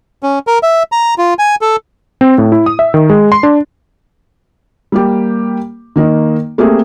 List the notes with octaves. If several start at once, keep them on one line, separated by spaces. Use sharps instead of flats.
C#4
A#4
E5
A#5
F4
G#5
A4
C4
A2
E4
D#6
E5
D#3
G#3
C6
D4
G3 A#3 G4
D#3 A#3 D#4
A3 A#3 C4 G4 G#4